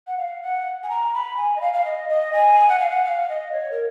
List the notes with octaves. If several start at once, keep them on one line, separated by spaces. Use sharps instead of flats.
F#5
F5
F#5
G#5
A#5
B5
G#5
D#5
F5
F5
D#5
D#5
G#5
F#5
F5
F#5
F5
D#5
C#5
A#4